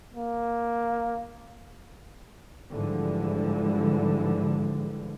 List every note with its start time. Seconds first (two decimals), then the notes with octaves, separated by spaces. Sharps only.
0.15 A#3
2.70 G#2 D3 E3 F3 G3 G#3